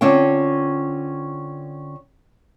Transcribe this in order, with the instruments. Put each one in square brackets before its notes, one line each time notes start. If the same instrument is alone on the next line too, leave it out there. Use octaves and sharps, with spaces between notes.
[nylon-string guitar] D3 C4 C#4 F4 G5